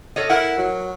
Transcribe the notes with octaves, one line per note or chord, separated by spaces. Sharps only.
A4 C#5 D#5
E4 A#4 F#5
F#3